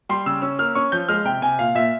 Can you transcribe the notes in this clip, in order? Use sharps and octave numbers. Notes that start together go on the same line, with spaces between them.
G3 C6
C#3 E6
C#4 E6
A#3 F6
C#4 C#6
F3 G6
G#3 F6
C3 G5
C3 G#5
A#2 F5
A#2 E5